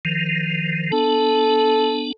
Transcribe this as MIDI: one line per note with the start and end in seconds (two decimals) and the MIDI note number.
0.05 0.92 51
0.05 0.92 53
0.92 2.12 59
0.92 2.12 62
0.92 2.12 69